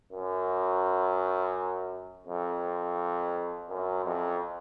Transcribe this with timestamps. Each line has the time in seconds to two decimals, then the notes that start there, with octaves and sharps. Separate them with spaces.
0.12 F#2
2.27 F2
3.69 F#2
4.05 F2